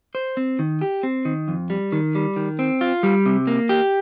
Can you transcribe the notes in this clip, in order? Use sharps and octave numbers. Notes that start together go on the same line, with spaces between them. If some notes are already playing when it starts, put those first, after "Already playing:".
C5
C4
D#3
G4
C4
D#3
F2
G3
D#3
G3
D#3
C4
F4
G3
C3
A#3
G4